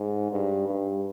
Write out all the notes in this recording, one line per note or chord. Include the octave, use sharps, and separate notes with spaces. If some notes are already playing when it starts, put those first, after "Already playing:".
Already playing: G#2
G2
G2